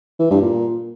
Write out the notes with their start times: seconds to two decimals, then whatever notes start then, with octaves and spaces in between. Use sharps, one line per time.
0.19 E3
0.30 G2
0.42 A#2